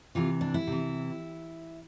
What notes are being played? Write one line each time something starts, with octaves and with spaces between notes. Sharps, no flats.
C3 E3 F4
D4
E4
C3 E3